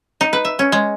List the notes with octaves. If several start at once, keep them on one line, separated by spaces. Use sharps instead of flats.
D#4
B4
E5
C#4
G#3